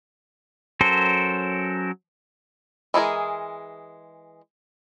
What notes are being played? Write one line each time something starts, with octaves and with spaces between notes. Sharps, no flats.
F#3 C#4 A4 A#4 C5
E3 G#3 G#4 A#4